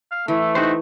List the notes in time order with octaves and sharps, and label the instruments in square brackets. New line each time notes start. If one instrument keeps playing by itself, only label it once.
[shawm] F5
[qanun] E3 [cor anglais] A3 [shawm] E5
[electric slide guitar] D#4 G4 C5 [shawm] F#4